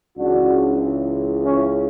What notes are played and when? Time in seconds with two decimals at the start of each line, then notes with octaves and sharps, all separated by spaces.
0.18 C#2 C#3 E3 D4 F#4
1.43 C#4 E4